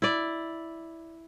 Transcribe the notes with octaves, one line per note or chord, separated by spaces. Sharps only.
E4 D5